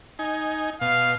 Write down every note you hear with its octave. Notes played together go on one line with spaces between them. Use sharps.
D#4 G#5
B2 F5